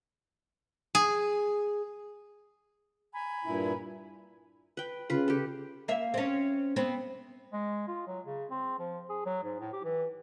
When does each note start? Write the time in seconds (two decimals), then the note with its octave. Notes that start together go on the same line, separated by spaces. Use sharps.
0.95 G#4
3.13 G#5 A#5 B5
3.45 G2 A#2 E4
4.77 B4 G5
5.10 C#3 F4 B4
5.28 G4 A4
5.88 A#3 E5
6.14 C4 C#4
6.76 B3 C4
7.53 G#3
7.88 F4
8.07 F#3
8.26 C#3
8.51 C4
8.79 F3
9.10 G#4
9.26 F#3
9.43 G#2
9.60 A2
9.73 G4
9.84 E3